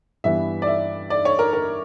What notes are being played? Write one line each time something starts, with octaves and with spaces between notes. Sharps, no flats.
G2 E3 B3 E5
D5
E5
D5
C#5
A#4
A#4